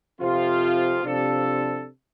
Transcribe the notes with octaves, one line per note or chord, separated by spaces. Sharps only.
F2 C3 F3 C4 F4
C3 F3 D4 A4